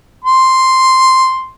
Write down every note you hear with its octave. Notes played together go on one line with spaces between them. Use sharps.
C6